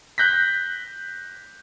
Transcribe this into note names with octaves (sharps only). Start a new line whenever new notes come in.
F#6 G6 A#6 B6